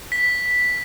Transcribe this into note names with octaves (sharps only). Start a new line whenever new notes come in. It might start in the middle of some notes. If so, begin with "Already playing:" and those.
B6